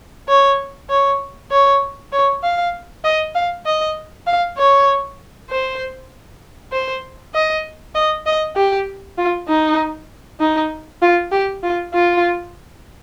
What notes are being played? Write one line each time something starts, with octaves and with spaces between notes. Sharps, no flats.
C#5
C#5
C#5
C#5
F5
D#5
F5
D#5
F5
C#5
C5
C5
D#5
D#5
D#5
G4
F4
D#4
D#4
F4
G4
F4
F4